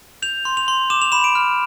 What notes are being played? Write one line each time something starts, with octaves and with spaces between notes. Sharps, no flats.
G6 F7
C6
F7
C6
D6 E7
F7
B5 E7
D7
F6